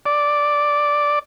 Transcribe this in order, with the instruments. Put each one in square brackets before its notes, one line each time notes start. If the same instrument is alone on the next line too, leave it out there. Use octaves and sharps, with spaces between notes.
[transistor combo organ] D5